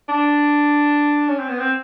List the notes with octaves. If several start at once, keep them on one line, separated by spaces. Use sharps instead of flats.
D4
C#4
C4
B3
C4